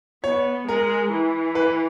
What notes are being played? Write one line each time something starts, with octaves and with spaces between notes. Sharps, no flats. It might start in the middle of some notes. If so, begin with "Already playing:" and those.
B3 C#5
G#3 A#4
E3
B4